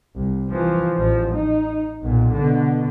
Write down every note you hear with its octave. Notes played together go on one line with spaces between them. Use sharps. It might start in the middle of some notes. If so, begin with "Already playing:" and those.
C2
E3 F3
A1 F3
D#4
B1 A#2
B2 D3